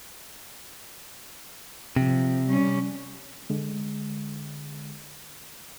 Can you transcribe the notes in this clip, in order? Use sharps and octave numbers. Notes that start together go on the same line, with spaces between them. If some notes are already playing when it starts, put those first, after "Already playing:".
C3 F3
G3 C#4
D3 G#3